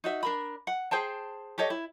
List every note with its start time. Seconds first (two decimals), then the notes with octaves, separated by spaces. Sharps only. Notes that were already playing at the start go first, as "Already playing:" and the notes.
0.04 D#4 F#4 E5
0.23 D4 A#4 B5
0.67 F#5
0.91 G#4 C5 G5 A5
1.58 G4 A4 C#5 D#5
1.70 E4